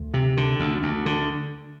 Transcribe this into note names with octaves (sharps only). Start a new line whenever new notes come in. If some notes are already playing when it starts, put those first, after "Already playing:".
Already playing: D2
C3
D3
D2
D2
D3